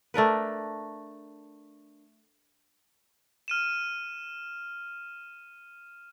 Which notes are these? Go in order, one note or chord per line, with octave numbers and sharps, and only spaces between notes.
A3 D4 A#4 B4
F6 D#7 E7